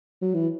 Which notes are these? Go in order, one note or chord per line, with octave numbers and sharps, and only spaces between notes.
F#3
E3